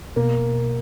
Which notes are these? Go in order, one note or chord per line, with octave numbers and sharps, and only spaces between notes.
B2 A#3